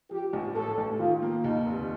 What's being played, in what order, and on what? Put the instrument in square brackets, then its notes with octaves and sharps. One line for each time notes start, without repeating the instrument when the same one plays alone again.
[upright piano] F3 [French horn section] G4
[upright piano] A1
[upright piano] A2 [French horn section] A4
[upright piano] A1
[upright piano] D#3 [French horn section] F4
[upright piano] A#3
[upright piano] D#2 [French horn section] D#4
[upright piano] F1